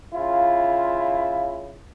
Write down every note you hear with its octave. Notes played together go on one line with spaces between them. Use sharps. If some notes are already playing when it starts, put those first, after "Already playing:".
C#3 E4 F4